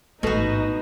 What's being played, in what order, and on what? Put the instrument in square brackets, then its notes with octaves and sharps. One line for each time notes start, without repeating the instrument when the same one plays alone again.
[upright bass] A1 G#2 [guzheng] B2 F#4 [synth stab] A3 A4 [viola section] D#4